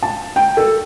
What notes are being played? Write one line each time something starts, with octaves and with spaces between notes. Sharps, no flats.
A5
G5
A4